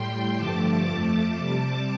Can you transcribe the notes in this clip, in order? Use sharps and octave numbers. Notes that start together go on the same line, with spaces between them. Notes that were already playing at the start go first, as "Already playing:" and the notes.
Already playing: A2 G3 G5 C6
G2 D3 F3 A3 A5 D6
F2 F3 A3
C3 G3 A5 D6